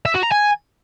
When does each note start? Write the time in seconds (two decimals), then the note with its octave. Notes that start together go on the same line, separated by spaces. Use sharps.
0.06 E5
0.14 F#4
0.23 A#5
0.32 G#5